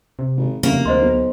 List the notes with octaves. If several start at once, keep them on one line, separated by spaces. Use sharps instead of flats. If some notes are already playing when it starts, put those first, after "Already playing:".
C3
G#1
F1 C#3 A#3
D2 C5 D#5 C6
B1